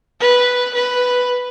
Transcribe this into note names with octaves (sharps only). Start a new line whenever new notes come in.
B4
B4